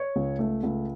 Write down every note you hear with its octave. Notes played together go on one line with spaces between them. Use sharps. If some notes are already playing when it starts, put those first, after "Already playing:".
Already playing: C#5
C#2
A3
C#2